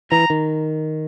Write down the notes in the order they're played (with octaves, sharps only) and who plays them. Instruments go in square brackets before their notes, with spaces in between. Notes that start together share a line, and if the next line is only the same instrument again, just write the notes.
[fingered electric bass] E3 [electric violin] A#5
[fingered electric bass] D#3